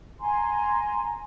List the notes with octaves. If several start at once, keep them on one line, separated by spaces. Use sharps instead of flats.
G#5 A#5 C6